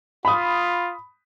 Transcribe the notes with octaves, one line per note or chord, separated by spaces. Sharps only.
F4 B5 D#6